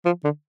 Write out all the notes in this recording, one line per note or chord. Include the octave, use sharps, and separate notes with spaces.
F3
D3